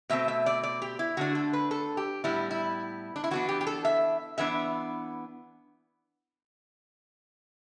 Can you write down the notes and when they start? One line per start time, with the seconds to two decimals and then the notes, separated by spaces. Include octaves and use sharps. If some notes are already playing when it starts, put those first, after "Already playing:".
0.10 B2 A3 C4 E5
0.28 E5
0.46 D5
0.63 D5
0.82 G4
0.99 E4
1.17 D3 A3 D4 F#4
1.35 A4
1.53 B4
1.71 A4
1.97 G4
2.24 A2 G3 B3 E4
2.51 E4
3.16 D4
3.24 E4
3.31 E3 B3 D4 F#4
3.49 G4
3.61 G4
3.67 A4
3.85 E5
4.38 E3 B3 D4 E5